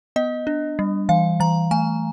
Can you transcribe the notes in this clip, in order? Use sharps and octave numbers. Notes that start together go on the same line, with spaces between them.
B3 D#5
D4
G3
E3 F5
E3 A#5
A3 G#5